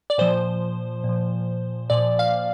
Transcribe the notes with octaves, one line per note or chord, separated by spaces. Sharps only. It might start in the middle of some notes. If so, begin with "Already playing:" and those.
D5
A#2 F3 C5
A#2
F3
A#2 F3 D5
F5